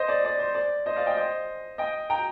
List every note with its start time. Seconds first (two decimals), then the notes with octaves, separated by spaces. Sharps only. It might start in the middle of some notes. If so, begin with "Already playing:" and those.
Already playing: C5 D#5
0.08 D5
0.25 D5
0.39 C5
0.54 D5
0.86 C5 D#5
0.96 D5 F5
1.06 D#5 G5
1.17 C5 D#5
1.78 D#5 G5
2.10 G5 A#5